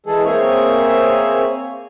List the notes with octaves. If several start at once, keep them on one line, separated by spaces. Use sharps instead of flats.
E3 G#3 G#4 A4
A#3 C4 G#4 C#5 E5